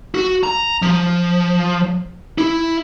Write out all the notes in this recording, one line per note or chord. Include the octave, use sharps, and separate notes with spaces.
F#4
A#5
F3
E4